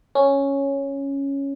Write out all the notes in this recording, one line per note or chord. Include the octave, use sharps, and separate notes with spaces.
C#4